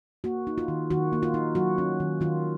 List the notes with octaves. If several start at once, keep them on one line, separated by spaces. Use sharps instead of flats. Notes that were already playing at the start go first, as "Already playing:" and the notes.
A#3 F#4
D#4
F4
D#3
D#3 F#4
A#3
F4
D#4
F#3 F#4
C#4
D#3
D#3 F4